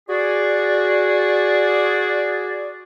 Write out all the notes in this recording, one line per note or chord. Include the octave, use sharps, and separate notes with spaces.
F#4 G#4 D5